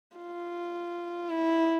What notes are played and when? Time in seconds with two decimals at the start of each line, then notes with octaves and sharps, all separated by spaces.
0.17 F4
1.30 E4